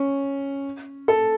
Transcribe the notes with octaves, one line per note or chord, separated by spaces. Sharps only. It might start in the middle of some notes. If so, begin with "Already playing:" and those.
Already playing: C#4
A4